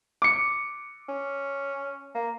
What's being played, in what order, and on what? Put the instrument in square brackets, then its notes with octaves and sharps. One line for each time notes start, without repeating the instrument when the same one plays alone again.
[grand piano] D6 C#7
[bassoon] C#4
A#3